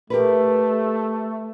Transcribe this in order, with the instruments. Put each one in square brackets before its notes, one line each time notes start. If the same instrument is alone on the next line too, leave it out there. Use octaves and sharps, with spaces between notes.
[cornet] A3 [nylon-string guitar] G4 A#4 B4